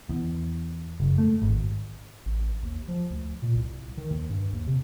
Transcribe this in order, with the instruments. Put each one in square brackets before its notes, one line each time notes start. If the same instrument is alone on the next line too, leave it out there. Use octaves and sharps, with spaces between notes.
[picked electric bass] E2
F#1
A3
G#1
[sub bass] A1
D#2
F3
D2
A#2
C2
D#3
D#2
G2
D#2
C3